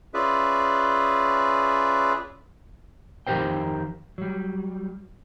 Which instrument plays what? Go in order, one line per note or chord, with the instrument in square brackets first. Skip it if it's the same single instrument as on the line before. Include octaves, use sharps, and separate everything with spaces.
[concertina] C#4 F4 G#4 B4 D5 E5
[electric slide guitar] F2 D#3 G4 A#4 C5 G5
F#3 G3